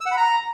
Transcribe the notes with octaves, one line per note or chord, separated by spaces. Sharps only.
E6
F#5
B5
A#5